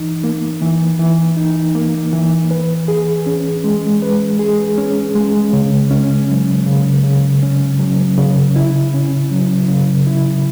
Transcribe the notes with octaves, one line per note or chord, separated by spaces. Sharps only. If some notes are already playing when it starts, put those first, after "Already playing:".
Already playing: E3 D#4
A#3
E3
E3
D#4
A#3
E3
B4
G#4
C#4
G#3
B4
G#4
C#4
G#3
C#3
C#4
F#3
C#3
C#3
C#4
F#3
C#3
E4
C#4
F#3
C#3
E4